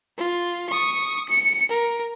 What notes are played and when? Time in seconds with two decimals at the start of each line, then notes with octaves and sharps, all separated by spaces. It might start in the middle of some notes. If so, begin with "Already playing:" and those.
0.18 F4
0.69 C#6 D#6
1.29 C#7
1.69 A#4